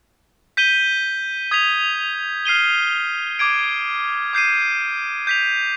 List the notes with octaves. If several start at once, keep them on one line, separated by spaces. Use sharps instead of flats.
G6 B6 D#7 G7
D#6 G#6 B6 F7
F6 C7 D#7 G7
D6 G#6 D7
D6 G6 C7 D#7
G6 B6 F7